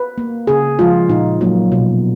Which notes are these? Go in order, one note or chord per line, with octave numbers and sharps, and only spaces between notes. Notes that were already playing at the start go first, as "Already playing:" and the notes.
Already playing: B4
A#3
C#3 G#4
F3 G#3 F4
A#2 D#4
F#3 A#3
B2